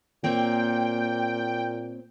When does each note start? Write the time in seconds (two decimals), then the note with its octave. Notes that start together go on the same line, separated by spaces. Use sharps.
0.24 A#2 A#3 C4 C#5 G5